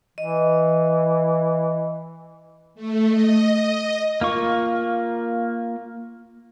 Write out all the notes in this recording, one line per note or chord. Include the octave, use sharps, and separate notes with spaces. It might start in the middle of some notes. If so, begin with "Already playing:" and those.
E3 D#5
A3
D#5
A#3 F4 C#6